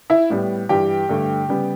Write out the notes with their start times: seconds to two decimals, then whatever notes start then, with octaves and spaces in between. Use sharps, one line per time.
0.10 E4 E5
0.30 A2 G3 B3
0.69 G2 E3 G3 G4 G5
1.09 G2 D3 A3
1.49 C#3 G3 B3